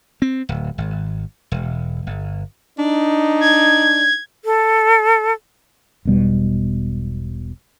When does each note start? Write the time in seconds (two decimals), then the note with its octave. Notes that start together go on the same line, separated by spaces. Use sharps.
0.22 C4
0.49 D1
0.78 G#1
1.52 E1
2.07 G1
2.79 D4 D#4
3.41 G#6
4.45 A4
6.05 E1 B1 B2 G3